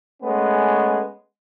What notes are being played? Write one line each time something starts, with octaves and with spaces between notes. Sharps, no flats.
G#3 A3 B3 C#4